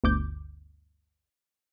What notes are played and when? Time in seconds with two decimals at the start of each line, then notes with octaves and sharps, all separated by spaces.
0.04 G1 D2 D6 G6